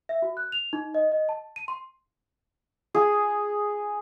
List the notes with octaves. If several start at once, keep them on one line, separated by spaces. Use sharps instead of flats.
E5
F#4
F#6
F7
D#4
D#5
D#5
A5
D#7
C6
G#4